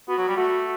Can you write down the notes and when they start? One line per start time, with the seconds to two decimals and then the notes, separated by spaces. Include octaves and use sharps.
0.08 B3 F#4
0.18 F#3
0.27 G3
0.37 A3 F#4